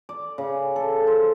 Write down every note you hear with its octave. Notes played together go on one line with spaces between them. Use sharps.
D5
C#3
A4
C5